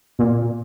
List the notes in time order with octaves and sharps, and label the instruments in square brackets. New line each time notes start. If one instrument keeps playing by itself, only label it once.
[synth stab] A#2